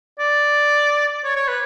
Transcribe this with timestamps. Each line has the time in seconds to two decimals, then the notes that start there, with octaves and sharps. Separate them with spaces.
0.19 D5
1.24 C#5
1.36 C#5
1.48 B4